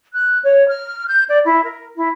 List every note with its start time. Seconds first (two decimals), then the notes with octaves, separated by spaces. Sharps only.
0.14 F#6
0.44 C#5
0.69 F6
1.07 G6
1.29 D5
1.45 E4
1.65 A#4
1.97 E4